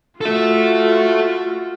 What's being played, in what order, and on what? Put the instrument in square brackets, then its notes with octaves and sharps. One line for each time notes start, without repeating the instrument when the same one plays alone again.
[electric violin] F4 F#4 [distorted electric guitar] A4 E5